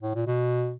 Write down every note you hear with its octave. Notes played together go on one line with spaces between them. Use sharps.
A2
A#2
B2